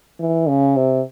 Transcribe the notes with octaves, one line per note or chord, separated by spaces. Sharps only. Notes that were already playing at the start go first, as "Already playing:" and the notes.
E3
C#3
C3